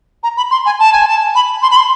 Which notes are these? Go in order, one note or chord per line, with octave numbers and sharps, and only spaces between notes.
A#5
B5
C6
G#5
A5
G#5
A5
B5
C6
B5
C6